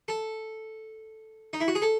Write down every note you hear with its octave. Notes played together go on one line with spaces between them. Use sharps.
A4
D#4
E4
F#4
G#4
A4